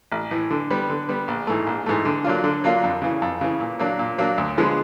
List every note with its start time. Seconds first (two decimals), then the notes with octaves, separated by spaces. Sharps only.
0.12 A1
0.31 A2 E3
0.50 D3
0.70 G3 B3
0.89 D3
1.09 G3 B3
1.28 A#1
1.47 G#2 E3 A3
1.67 A#1
1.86 G#2 E3 A3
2.05 D3
2.24 F#3 A#3 D4 F4
2.44 D3
2.64 F#3 A#3 D4 F4
2.84 F2
3.02 C#3 E3
3.22 F2
3.41 C#3 E3
3.60 A#2
3.80 F#3 A#3 D4
3.99 A#2
4.18 F#3 A#3 D4
4.38 D2
4.57 D3 F3 G#3 B3